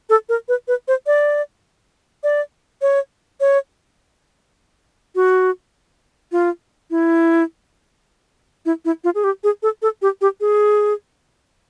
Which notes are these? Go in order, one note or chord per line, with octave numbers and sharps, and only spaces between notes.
A4
A#4
B4
B4
C5
D5
D5
C#5
C#5
F#4
F4
E4
E4
E4
F4
G#4
G4
G#4
A4
A4
G4
G4
G#4